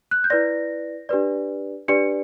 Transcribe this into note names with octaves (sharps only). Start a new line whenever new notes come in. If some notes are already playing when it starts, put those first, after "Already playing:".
F#6
G6
E4 B4 D5 A#6
D4 G4 B4 D5
D4 G4 B4 D5 C#7